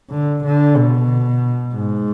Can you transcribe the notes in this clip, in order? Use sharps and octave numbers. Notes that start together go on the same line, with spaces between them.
D3
D3
B2
G#2